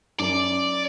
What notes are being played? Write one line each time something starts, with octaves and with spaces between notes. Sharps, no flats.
F#2 D5